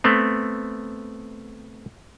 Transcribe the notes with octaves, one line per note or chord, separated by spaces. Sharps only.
A3 B3 C4